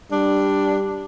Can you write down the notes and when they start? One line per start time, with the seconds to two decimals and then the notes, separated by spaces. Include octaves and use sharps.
0.12 G3 D4